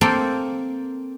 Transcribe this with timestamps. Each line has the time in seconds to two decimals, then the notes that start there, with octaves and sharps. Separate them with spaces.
0.01 A#3 C4 A4 C5 G5